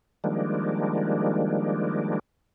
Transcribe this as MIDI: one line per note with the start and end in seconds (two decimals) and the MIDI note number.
0.24 2.19 51
0.24 2.19 53
0.24 2.19 55
0.24 2.19 56
0.24 2.19 58
0.24 2.19 62